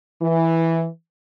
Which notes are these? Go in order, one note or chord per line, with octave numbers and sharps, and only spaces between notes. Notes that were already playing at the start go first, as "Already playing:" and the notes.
E3